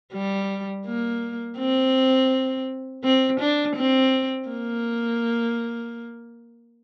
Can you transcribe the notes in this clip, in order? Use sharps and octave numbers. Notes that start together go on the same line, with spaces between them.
G3
A#3
C4
C4
D4
C4
A#3